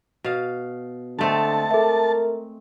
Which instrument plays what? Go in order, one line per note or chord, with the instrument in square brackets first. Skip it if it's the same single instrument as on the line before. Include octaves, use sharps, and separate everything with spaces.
[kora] B2 F5
[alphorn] D3 [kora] G#3 A3 C4 [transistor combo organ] A5
[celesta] A4 E5 [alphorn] A#4